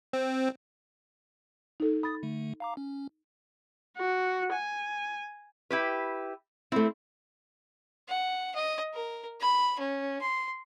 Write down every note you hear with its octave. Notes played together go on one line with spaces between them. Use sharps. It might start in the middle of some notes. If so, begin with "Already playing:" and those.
C4
D#4 A4
B5 D#6 A6
D3 A3
F5 A#5 D6
C#4
F#4
G#5
E4 G4 B4
A3 C4 E4
F#5
D#5
A#4
B5
C#4
C6